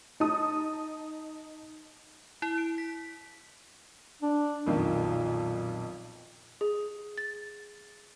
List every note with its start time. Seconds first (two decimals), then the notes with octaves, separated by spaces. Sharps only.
0.20 D#4 A5 D#6
2.42 E4
2.58 D7
2.78 B6
4.22 D4
4.66 B1 F2 A#2 D#3
6.61 G#4
7.18 A6